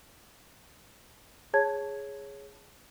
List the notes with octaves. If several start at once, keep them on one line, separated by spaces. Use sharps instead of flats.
G#4 C#5 A5 G#6